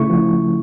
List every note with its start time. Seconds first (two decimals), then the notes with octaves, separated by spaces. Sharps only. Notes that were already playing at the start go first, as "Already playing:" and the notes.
Already playing: C#3 A3 E4 C#6
0.10 F3